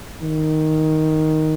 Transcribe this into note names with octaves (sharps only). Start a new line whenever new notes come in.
D#3